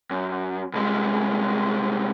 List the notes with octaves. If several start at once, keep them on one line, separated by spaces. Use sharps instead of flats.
F#2
C2 G#3